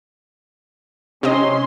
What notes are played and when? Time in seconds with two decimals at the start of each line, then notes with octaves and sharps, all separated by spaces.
1.23 C3 C#4 D#5 C6